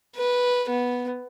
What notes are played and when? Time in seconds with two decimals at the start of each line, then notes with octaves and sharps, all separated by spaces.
0.16 B4
0.70 B3